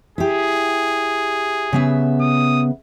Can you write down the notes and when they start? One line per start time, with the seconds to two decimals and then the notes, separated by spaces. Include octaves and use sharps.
0.18 E4 G4 G#4
1.73 C#3 B3 E5
2.21 D#6